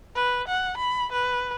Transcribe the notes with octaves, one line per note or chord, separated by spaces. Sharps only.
B4
F#5
B5
B4